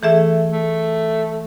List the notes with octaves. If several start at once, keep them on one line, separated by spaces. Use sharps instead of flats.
E3 A3 G#4 E5
A3